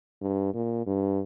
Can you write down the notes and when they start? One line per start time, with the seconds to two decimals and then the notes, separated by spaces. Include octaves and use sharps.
0.22 G2
0.54 A#2
0.87 G2